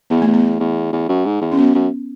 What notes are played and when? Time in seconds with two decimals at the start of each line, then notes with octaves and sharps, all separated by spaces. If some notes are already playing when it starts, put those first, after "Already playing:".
0.10 E2 B3
0.22 A3
0.27 E2
0.33 B3
0.60 E2
0.93 E2
1.09 F#2
1.26 G#2
1.41 E2
1.52 C#4
1.58 F#2 B3
1.75 F#2